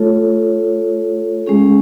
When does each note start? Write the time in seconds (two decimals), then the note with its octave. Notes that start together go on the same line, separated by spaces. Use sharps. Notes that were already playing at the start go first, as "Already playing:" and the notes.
Already playing: A3 F4 A4 C#5
1.47 G#3 C#4 G#4